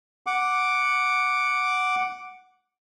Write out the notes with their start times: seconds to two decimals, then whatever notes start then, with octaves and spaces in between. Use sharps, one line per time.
0.27 F#5 D6